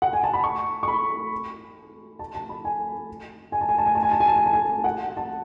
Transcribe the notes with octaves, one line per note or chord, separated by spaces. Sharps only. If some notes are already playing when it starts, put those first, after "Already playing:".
F#5
G#5
A5
B5
C#6
C#6
B5
A5
A5
B5
G#5
G#5
A5
G#5
A5
G#5
A5
G#5
A5
G#5
A5
G#5
A5
G#5
F#5
A5